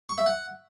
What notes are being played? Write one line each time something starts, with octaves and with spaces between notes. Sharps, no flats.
C#6
E5
F#5